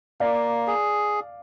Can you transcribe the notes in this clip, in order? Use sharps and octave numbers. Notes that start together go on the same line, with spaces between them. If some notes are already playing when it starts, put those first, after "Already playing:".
A#3 D5 F5
G#4